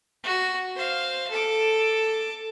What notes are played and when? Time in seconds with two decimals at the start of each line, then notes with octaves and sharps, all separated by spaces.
0.23 F#4
0.76 C5 F5
1.30 A4 D6